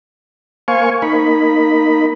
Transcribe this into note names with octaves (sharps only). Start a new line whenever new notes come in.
A#3 C5 F5 G#5 C#6
A#3 D#4 B5